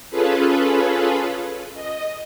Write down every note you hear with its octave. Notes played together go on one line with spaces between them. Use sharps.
C#4 F4 G#4 A4 B4
D#5